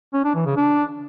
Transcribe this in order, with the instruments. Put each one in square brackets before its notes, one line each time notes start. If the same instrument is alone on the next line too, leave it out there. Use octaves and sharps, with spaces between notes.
[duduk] C#4
D4
E3
C#3
D4